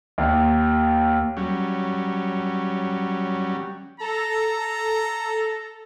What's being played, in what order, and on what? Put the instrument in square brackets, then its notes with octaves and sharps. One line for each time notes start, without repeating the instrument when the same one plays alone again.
[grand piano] D#2
[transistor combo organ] F#3 G3 C#4
[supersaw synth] A4 [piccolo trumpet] A#5